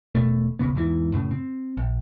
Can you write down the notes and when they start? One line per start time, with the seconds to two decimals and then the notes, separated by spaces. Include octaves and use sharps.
0.15 E1 B2 A3
0.59 D#1 B1 C#3 B3
0.75 E2 G#2 E3
1.12 F#2 A2 C#3
1.31 C4
1.77 A#1